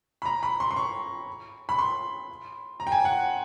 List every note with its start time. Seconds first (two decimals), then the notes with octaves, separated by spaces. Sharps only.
0.22 B5
0.26 A#5
0.43 B5
0.60 C6
0.71 C6
0.76 C#6
1.69 B5
1.79 C6
2.80 A#5
2.87 G5
2.92 G#5
3.05 F#5